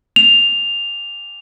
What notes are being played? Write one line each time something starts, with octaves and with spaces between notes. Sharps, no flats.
F7